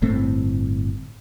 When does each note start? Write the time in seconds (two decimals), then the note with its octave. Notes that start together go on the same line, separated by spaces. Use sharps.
0.02 G1 A2 A3 C4